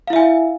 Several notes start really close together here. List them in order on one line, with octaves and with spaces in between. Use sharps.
F5 E4 E5 G#5